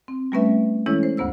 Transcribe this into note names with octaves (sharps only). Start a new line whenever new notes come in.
C4
G3 A3 B3 C#4 B4 E5
E3 G#3 C#4 E4 A4 C#5
C5
D2 G2 B3 C5 E6